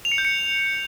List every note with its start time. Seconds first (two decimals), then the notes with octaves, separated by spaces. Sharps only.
0.05 F7
0.12 C#7
0.18 G6
0.25 C#7